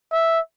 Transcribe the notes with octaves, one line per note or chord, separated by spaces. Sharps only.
E5